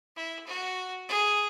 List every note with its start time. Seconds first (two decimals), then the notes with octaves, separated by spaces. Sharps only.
0.16 E4
0.47 F#4
1.09 G#4